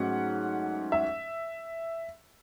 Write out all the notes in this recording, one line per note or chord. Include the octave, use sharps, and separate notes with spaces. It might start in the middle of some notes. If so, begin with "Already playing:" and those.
Already playing: G#2 F#3 A3 C#4 F#5
E5